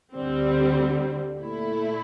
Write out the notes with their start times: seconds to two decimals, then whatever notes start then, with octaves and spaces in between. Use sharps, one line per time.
0.14 D2 D3 G3 C4
1.40 A#2 A3 E4